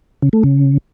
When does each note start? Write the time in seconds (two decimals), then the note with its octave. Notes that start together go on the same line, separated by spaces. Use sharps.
0.22 C#3
0.33 A3
0.44 C#3